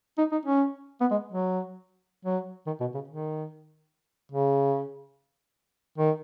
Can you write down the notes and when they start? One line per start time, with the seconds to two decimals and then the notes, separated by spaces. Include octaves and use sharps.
0.18 D#4
0.32 D#4
0.45 C#4
1.01 B3
1.11 G#3
1.32 F#3
2.25 F#3
2.67 D#3
2.81 B2
2.94 C#3
3.08 D#3
4.32 C#3
5.98 D#3